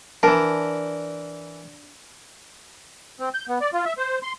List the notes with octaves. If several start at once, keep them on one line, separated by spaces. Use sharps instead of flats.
E3 D4 A#4 A5
C4
G6
B3
D5
F4
E5
C5
C6